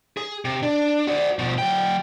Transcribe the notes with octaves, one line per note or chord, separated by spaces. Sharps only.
G#4
C3
D4
F#4 D5
B2 F3
F#3 G5